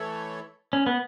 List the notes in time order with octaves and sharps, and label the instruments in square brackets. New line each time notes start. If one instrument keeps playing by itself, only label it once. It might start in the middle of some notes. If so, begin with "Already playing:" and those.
Already playing: [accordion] E3 A3 E4 A4 C#5
[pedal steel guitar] C#4
B3